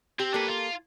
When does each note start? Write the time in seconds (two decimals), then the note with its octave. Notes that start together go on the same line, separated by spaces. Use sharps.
0.19 C4 G4
0.34 A#3 D4 A4 B4
0.49 F4